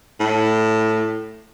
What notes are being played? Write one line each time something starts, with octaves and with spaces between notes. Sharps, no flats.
A2